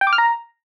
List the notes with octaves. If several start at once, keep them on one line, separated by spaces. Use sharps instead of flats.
G5
D6
F6
A#5